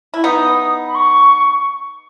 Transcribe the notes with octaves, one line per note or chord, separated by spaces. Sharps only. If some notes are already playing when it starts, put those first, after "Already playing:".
E4
B3 D#4 D#6
B5
C#6